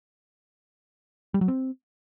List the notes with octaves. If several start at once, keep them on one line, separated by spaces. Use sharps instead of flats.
G3
F#3
C4